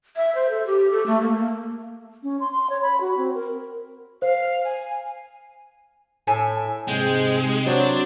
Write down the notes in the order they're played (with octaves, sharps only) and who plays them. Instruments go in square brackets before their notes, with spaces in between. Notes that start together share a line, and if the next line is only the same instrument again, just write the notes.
[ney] E5
C5
A4
G4
A4
A3
A#3
A#3
[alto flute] C#4
C6
C6
C#5
B5
F#4
C4
A#4
[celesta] C5 [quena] F5
[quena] G#5
[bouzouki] A2 E5 G#5
[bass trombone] G#2 [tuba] C3 [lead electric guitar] G#3 [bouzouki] G5
[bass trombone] F#3 [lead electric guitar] D4 [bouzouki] C5